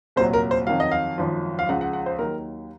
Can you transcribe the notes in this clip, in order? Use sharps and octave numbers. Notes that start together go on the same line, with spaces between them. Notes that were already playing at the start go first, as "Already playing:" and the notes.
C2 A#2 F#3 C5
A#4
C5
F2 D#3 F#3 F5
D#5
F5
G#1 F#2 F3
F5
C#2 C#3 F3 F#5
F#5
F#5
C5
D#2 D#3 F#3 A#4